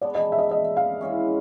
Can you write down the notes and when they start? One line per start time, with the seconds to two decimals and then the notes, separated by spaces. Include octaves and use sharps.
0.01 G#3 B3 D4 D5
0.15 D#5
0.32 E5
0.38 D#5
0.51 D#5
0.77 F5
1.01 E3 G#3 C#4